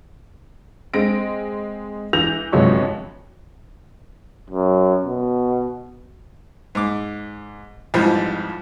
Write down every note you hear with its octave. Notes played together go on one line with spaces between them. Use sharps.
G#3 C4 A#6 D7
E3 G6 A#6 F7
G1 C3 F3 F#3 G#3 C#6
F#2
B2
G#2 D6
F2 G#2 E3 F3 G3